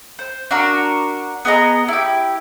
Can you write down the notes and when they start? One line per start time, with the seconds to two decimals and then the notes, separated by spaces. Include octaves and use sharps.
0.19 C5
0.51 D4 F#4 A#4
1.45 B3 G#4 D#5 A#5
1.88 E4 G4